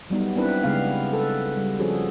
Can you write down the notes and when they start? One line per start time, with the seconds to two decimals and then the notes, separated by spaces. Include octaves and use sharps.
0.10 F#3 G3 B3 D#4
0.36 B3 C4 D4 E4 B4
0.63 C#3 G#3 B3 F5 F#5
1.13 A4 B4
1.57 G3
1.80 F3 C#4 F#4 G#4 A4